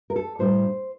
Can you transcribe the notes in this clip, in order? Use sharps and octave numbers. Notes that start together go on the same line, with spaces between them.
A#4
A4
A2 G3 D4 C5